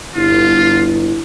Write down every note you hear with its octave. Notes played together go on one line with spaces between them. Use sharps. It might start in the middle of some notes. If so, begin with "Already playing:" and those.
G1 E4 F4